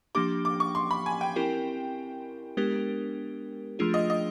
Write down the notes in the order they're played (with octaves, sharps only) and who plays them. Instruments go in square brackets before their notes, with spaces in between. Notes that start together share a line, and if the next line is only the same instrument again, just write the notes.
[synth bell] F3 A#3 D4 G4 [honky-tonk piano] D6
[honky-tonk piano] D6
C#6
C6
B5
G#5
G5
[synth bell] C4 E4 G4 A#4
G#3 B3 D4 G4 A#4
F3 A3 D4 F4 G#4
[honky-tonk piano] D#5
D#5